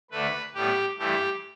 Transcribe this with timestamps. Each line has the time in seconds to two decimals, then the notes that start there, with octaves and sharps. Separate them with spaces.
0.11 D2 D3 A3 B4
0.55 A2 G3 B3 G4
0.99 G2 E3 A3 G4